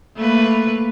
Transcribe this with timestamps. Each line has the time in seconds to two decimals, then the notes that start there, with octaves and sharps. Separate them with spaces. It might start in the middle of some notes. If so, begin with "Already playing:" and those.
0.16 A3 A#3 B4